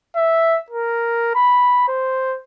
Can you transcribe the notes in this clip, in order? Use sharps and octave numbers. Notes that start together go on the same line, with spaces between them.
E5
A#4
B5
C5